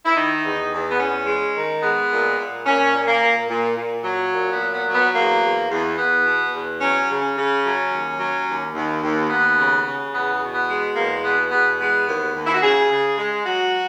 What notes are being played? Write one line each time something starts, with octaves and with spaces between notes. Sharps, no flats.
E4
D#3 D#4
E2
E2
B3
E2 C#4
G#3
D#3
G#3 B3
A#2
A#2
A#2 C#4
A#2
A#3
A#2
A#2
A#2
F#3
A#2
B3
F#3
B3
F#3
B3
E2 A#3
E2
E2
E2 B3
B2
E2
F#3 C#4
C#3
C#4
C#3
F#3
D#2
F#3
D#2
D#2
D#2
D#2 B3
C#3
C#3
E2 B3
B2
B3
G#3
E2 A#3
B2 B3
E2 B3
G#3 B3
D#2
D#2
E4
F#4
C#3 G#4
C#3
G#3
F#3 F#4